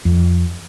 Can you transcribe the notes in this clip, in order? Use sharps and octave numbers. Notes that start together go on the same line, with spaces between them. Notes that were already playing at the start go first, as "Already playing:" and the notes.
F2